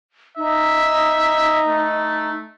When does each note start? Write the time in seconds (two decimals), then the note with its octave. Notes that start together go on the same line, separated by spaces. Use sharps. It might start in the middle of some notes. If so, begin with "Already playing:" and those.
0.37 D#4 E5
1.68 A3